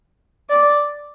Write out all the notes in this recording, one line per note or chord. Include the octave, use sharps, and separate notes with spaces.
D5